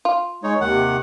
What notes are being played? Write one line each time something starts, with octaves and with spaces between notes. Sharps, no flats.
F4
G#3 D#4 C#5
D#2 C3 D#3 F#5